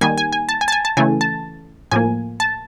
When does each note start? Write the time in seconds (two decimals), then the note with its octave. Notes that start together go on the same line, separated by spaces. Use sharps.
0.01 D#3 G3 A#3 G#5
0.18 G#5
0.33 G#5
0.49 A5
0.61 G#5
0.68 A5
0.72 G#5
0.85 A5
0.97 C#3 E3 A3 G#5
1.21 A5
1.91 A2 F3 A#3 G#5
2.40 A5